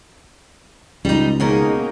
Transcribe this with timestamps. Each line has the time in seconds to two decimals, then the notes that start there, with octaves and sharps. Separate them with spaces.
1.05 C#2 G3 D#4
1.40 B2 A#3 C#4 D#4 G#4 A#4